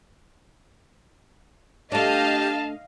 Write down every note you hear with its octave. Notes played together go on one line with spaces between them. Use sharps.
A3 D4 G4 D#5 F5 A5